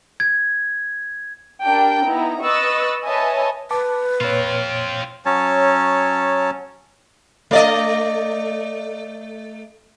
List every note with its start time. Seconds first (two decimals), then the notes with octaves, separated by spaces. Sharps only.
0.20 G#6
1.64 D4 G4 A#4 G5 A5
2.05 B3 D#4 E4 A#5
2.42 B4 D#5 C#6 E6 F#6 A6
3.06 B4 C#5 D#5 E5 G#5 A5
3.71 B4 A5 D6
4.21 A#2 C4 F4 C#5
5.25 F#3 C#4 C#5 A5
7.51 A3 D5 D#5